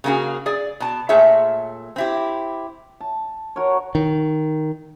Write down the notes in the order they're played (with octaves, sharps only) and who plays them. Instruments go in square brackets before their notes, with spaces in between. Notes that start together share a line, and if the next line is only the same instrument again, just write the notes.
[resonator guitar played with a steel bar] C#3 A#3 C#4 F#4 G#4
G#4 D5
B2 A5
A#2 A3 G#4 C#5 E5
C4 E4 G4
[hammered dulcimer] A5
F#4 A#4 C#5
[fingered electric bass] D#3